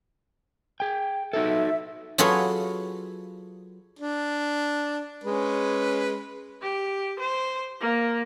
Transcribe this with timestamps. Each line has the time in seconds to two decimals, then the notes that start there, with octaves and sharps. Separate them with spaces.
0.80 G#4 G5
1.33 D#4 F#4 A4 E5
2.18 F#3 F4 G#4 A4 B4 C#5
3.99 D4
5.24 G#3 C#4 B4
6.62 G4
7.20 C5
7.81 A#3